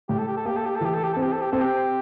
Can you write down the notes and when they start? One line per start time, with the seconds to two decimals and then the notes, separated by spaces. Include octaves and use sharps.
0.09 A2 G4
0.19 A4
0.28 G4
0.37 A4
0.45 A#3 G4
0.57 A4
0.66 G4
0.76 A4
0.81 E3 G4
0.94 A4
1.04 G4
1.13 C4 A4
1.23 G4
1.32 A4
1.42 G4
1.51 C4 A4
1.61 G4